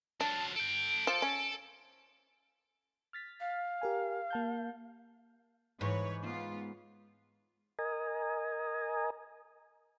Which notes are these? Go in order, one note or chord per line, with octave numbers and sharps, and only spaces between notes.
F#3 D4 F4 A5
A4 G5 D7
F3 A4
C#4
F6 A6 B6
F5
G4 A#4 G#5
A#3 A5 G6
G#2 E3 B4 C#5
B3 F4
A#4 D#5 G#5